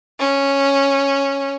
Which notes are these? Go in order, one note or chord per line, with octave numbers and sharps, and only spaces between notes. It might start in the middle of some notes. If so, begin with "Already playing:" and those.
C#4